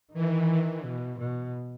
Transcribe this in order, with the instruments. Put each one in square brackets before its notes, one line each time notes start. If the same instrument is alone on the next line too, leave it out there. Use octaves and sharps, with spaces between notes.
[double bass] D#3 [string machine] E3
[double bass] B2
B2